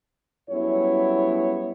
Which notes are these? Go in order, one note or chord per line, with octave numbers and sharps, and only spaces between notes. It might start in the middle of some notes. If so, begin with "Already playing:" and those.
F#2 G3 B3 E4 C#5